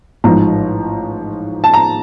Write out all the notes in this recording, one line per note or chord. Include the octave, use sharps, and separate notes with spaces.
A1 G#2 F3 A#5
A5
A#5